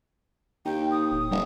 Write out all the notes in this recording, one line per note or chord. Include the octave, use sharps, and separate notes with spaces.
D#2 D#4 G5
D#6
D1
F#1 G3